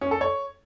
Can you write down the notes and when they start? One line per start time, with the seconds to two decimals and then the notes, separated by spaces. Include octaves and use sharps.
0.01 C#4
0.11 A4
0.21 C#5